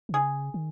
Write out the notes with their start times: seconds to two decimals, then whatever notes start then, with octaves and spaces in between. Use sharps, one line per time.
0.09 D#3
0.13 C#3 G#4
0.54 D#3